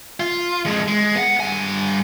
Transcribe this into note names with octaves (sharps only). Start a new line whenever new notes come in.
F4
F2 G#3
G#3
B3 F#5
G2 G#5